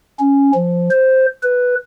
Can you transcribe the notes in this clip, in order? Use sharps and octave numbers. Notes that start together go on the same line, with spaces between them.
C#4
F3
C5
B4